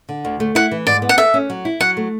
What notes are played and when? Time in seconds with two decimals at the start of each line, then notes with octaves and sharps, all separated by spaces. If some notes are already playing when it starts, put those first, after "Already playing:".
0.09 D3
0.25 D2
0.40 A3
0.55 E4 F#5
0.71 E3
0.86 G#2 D5
1.02 B3
1.09 F#5
1.18 A4 E5
1.34 C#4
1.50 F#3
1.65 E4
1.80 F#3 F#5
1.97 A3